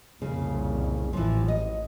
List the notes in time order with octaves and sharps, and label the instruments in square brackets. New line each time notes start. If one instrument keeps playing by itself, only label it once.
[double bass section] C2 F2 A#2 [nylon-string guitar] C#3
[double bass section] A1 [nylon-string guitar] E3 F3
[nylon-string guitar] D#5